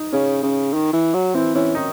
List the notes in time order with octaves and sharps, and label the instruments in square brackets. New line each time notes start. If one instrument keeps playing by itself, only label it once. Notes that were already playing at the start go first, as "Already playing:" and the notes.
Already playing: [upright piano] D#4
[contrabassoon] C#3 [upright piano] C#4
[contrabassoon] C#3
D#3
E3
F#3
[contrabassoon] E3 [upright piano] C4
[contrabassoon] E3 [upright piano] C#4
[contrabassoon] D#3 [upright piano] D#4